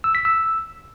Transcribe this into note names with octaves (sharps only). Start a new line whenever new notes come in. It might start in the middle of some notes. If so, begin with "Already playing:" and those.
E6
B6
E6